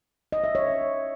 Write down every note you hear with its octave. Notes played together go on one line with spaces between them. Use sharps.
D#5
E5
C#5